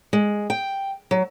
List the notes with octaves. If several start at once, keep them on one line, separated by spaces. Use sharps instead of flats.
G#3
G5
F#3